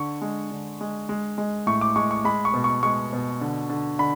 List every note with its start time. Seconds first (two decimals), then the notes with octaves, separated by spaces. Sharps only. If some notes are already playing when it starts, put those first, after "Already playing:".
Already playing: D3 C#6
0.22 G#3
0.52 D3
0.81 G#3
1.09 G#3
1.38 G#3
1.67 A2 C#6
1.81 D6
1.96 G#3 C#6
2.11 C#6
2.25 G#3 B5
2.45 C#6
2.54 B2
2.64 C#6
2.83 G#3 C#6
3.13 B2
3.41 D3
3.70 D3
3.99 D3 B5